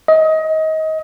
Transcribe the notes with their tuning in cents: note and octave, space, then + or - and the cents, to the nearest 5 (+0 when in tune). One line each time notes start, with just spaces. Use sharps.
D#5 +25